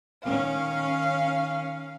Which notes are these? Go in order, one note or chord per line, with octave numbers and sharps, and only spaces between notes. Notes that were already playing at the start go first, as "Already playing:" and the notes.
D#3 C#4 F5